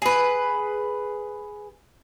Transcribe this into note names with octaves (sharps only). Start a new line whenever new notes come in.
G#4 B4